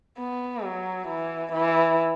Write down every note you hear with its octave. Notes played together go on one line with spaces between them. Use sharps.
B3
F#3
E3
E3